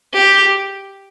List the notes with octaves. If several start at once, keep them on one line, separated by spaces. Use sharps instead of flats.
G4